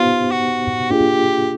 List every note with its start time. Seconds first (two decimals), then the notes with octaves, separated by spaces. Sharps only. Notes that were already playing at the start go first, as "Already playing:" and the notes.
Already playing: B3 D#4 F4 G4 C5
0.31 F#4
0.90 A#3 D4 F4 G4 G#4